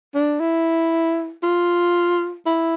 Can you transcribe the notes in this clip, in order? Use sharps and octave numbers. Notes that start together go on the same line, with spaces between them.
D4
E4
F4
E4